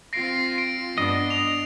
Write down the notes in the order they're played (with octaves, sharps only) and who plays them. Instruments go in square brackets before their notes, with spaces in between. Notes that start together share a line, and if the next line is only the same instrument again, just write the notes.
[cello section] C4 F4 [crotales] A#6 C7 D7
[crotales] D7
[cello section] G2 B3 D4 [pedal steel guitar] D#5
[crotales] F7